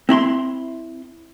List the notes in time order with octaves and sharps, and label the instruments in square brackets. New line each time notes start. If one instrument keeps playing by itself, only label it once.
[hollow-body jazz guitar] C4 E4 B5 C6